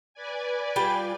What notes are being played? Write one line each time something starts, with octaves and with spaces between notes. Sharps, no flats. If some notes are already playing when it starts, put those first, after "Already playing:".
B4 D5 G#5
G3 F4 G5